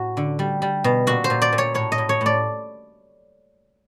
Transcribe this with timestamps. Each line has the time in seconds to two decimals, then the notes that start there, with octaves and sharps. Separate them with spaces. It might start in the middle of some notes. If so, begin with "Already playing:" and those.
Already playing: A2 F#4
0.17 D3
0.39 G3
0.62 G3
0.84 B2
1.07 A#2 F#4
1.24 C5
1.30 A#2
1.42 D5
1.53 A#2
1.58 C#5
1.74 A2 C#5
1.92 D#5
1.98 A2
2.09 C#5
2.21 A2
2.26 D5